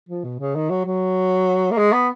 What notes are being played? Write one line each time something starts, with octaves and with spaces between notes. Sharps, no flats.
F3
B2
C#3
D#3
F#3
F#3
A#3
G#3
B3